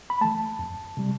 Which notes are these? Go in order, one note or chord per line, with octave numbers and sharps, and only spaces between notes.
B5
E3 A3 A5
F2
C3 G3